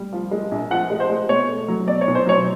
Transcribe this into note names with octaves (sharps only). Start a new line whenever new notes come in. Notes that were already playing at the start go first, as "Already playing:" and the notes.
Already playing: G3
F3
G#3
A#1
F3 F#5
G#3
C5
G#3
B2 C#5
A3
F#3
B2 D5
C#5
B1
C5
F#3 C#5